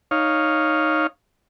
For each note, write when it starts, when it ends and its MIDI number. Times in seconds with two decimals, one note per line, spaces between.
0.11 1.07 63
0.11 1.07 73
0.11 1.07 77